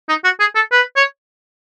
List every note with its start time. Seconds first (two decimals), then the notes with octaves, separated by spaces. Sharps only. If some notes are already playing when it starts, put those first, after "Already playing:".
0.09 D#4
0.24 F#4
0.40 G#4
0.55 A4
0.72 B4
0.96 C#5